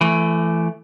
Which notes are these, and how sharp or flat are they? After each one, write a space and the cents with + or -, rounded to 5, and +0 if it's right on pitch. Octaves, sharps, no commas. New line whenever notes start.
E3 +30 A3 +0